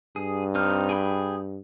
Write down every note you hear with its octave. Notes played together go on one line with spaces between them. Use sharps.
G2 G#4
C4 D#4 F6
G#4 G5 B5